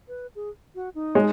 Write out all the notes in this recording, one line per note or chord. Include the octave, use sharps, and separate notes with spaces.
B4
G#4
F#4
D#4
G#3